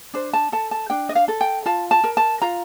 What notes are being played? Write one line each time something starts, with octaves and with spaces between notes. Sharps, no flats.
D4 C5
A5
A4 A5
A5
D4 G5
D#5
F5
A4
G5
F4 A5
A5
A#4
A5
F4 A#5